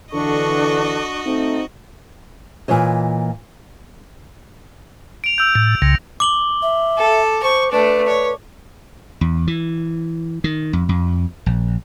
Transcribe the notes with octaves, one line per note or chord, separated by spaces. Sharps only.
D3 E3 D4 F#4 A4 D#5 C#6
A3 C4 D#4
A#2 E3 F4 C#5 D#5
D7 F7
E6 G6
A2
C2 C#3 A#6
D6 F#7 G7
E5
A4
C5 C#6
A3 D4 B4
C#5
E2
E3
D#3
F2
F2
A#1